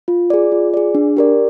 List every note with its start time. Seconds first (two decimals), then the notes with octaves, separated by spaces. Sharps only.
0.08 F4
0.30 G#4 D5
0.52 F4
0.74 G#4 D5
0.95 D4
1.17 G4 A#4 D5